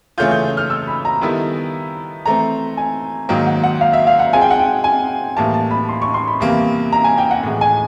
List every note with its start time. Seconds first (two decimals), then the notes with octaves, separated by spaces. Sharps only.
0.18 C#3 E3 A3 C#4 F4 G6
0.31 G6
0.57 F6
0.70 E6
0.87 B5
1.05 A#5
1.21 D#3 G3 B3 E4 A4
2.25 E3 A3 C4 A#5
2.77 G#5
3.29 G#2 D#3 F#3 A#3 G5
3.47 F#5
3.64 F#5
3.81 F5
3.93 E5
4.07 F5
4.19 F#5
4.33 G#3 C4 F4 G#4 G#5
4.41 G5
4.51 F#5
4.59 G5
4.84 G#5
5.37 A2 E3 G3 A#3 A5
5.54 A5
5.71 B5
5.89 C6
6.02 C#6
6.14 C6
6.28 B5
6.40 E2 C3 E3 G3 A#3
6.92 A#5
7.04 G#5
7.18 G5
7.31 F#5
7.43 A2 E3 G#3
7.61 G#5